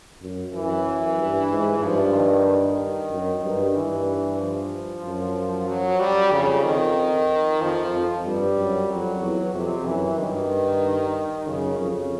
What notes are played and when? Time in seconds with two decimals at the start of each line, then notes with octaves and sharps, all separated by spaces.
0.21 F#2
0.54 F#2 E3
1.18 G2
1.50 G#2
1.82 G2 F3
2.14 D#3
2.46 D#3
3.11 F#2
3.44 G2
3.75 G2 E3
4.39 F3
5.04 F#2
5.68 F#3
6.00 G3
6.32 F2 C#3
6.64 D#3
7.61 F2 F3
7.94 F2
8.25 G2 G3
8.58 F#2
8.89 F2 F#3
9.22 E2
9.54 F2 C3
9.86 F#2 E3
10.18 G2 D#3
11.47 F#2 C#3
11.79 F2 C#3